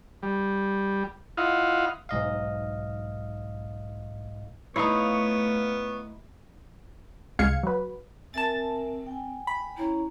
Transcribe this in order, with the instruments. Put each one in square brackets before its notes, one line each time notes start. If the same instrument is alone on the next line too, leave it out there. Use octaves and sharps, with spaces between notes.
[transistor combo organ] G3
E4 F4 D#5 F5 F#5
[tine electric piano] B1 G#2 D#5 F5
[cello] A3 [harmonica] B3 [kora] D#4 E4 [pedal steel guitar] C#5 F5 C#6
[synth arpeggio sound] C#2 G#3 F5 G#6 C#7
F#3 B4
[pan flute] C4 [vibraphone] A#4 E5 G#5 [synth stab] A5 A6
[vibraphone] G5 G#5
[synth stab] B5
[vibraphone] C#4 C#5 A#5 [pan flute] E4